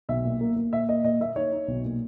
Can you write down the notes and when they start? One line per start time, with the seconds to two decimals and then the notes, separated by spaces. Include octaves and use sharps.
0.09 B1 E5
0.24 A#2
0.41 A#3
0.56 A#3
0.73 A#2 E5
0.89 A#3 D#5
1.04 A#2 D#5
1.20 A#3 E5
1.36 D#4 C#5
1.52 D#4
1.68 B1
1.85 A#2